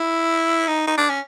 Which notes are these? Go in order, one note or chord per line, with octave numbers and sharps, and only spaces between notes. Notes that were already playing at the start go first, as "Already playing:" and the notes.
Already playing: E4
D#4
D#4
D4
C#4